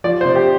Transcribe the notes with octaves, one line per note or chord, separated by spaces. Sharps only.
F3 D5
C5
C3
G4